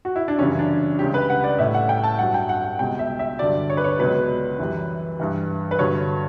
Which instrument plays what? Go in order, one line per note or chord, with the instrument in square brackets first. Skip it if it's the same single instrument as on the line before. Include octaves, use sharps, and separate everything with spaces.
[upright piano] F#4
E4
D4
F#2 C#3 E3 G3 C#4
D4
C#2 C#3 G3 G4
B4
F#5
D5
A2 G3 E5
F#5
G5
A5
G2 F#3 F#5
G5
F#5
F#5
C#2 B2 G3 G5
E5
E5
G2 D3 F#3 D5
C#5
B4
C#5
C#2 B2 F#3 B4
F#2 E3 G3
G2 E3 G3
B4
G2 D3 F#3 C#5